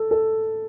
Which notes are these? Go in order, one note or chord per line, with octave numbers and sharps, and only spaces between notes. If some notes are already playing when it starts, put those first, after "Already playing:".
Already playing: A4
A4